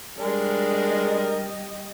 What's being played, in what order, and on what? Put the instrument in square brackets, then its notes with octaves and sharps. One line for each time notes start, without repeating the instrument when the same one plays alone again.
[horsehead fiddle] G3 D#5 [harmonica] G#3 D4 A#4